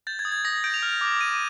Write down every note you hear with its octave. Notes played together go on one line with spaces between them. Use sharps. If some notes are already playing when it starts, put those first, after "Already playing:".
G6 A6
G#6
D#6
G#6
D#6 A#6
G6 D7
F7
F6
D6
D6 D#7